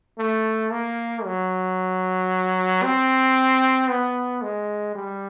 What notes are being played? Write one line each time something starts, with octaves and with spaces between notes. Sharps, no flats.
A3
A#3
F#3
C4
B3
G#3
G3